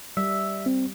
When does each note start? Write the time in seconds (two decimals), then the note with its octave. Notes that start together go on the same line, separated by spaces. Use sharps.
0.17 G3 E5
0.66 C4